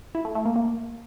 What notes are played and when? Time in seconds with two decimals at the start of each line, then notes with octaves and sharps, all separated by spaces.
0.15 E4
0.25 A3
0.35 A3
0.45 A#3
0.56 A#3